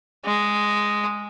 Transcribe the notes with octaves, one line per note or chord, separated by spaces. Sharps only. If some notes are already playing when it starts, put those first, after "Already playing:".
G#3